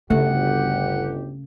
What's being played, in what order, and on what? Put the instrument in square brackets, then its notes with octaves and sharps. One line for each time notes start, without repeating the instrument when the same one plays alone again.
[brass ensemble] G1 D2 G4 [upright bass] C#3 [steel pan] A3 [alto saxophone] F#5